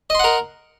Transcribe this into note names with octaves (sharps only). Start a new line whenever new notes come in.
A#4 D#5 F#5 C6